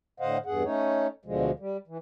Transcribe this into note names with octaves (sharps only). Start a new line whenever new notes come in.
A2 D3 C5 D#5 F5 F#5
E2 G2 G#4 F#5
A3 C#4 D#4 C#5
D2 B2 D3 F3 G#3
G3
E3